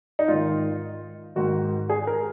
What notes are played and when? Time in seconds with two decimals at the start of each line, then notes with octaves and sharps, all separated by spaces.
0.19 D#4
0.28 G#2 D#3 F4
1.36 G#2 D#3 F#4
1.89 G#4
2.07 A#4